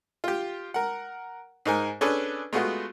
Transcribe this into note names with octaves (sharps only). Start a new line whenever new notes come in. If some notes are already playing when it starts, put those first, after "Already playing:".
F4 G4
A#4 F#5
G#2 D#4 A#4 G#5
C#4 D4 G#4 A4 B4
G#3 A3 B3 F4 F#4